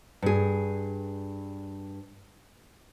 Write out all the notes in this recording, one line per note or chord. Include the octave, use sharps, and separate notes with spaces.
G2 G#4